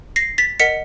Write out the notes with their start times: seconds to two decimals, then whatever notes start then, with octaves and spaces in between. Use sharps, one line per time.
0.16 A#6 C7
0.38 A6 B6
0.60 A#4 D#5 F#5 B6 C#7